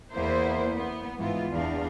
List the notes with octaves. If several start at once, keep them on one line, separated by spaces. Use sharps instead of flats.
E2 A#3 B3 E4 C5
B3
G#2 E3 B3 F4
E2 D4 F5